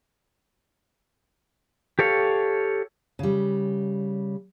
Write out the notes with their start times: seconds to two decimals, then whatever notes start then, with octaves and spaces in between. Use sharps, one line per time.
1.99 G4 A4 C#5 F5
3.19 C#3 G3